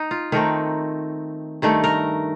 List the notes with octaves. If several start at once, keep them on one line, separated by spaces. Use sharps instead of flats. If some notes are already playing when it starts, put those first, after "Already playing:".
Already playing: D#4
F4
D#3 A3 C4 A#4
G2 D#3 A3
A#4